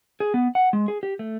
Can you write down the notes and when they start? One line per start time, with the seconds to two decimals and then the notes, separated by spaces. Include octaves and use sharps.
0.20 G#4
0.34 B3
0.55 F#5
0.73 G#3
0.88 G#4
1.03 G4
1.19 A3